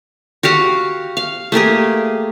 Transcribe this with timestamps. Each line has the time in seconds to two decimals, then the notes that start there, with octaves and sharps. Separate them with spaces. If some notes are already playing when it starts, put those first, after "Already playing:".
0.43 F#4 G4 F5 F#5
1.17 F5
1.52 A3 A#3 G4 G#4